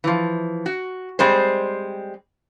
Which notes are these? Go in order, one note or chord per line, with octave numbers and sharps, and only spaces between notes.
E3 F3
F#4
G3 G#3 C4 C5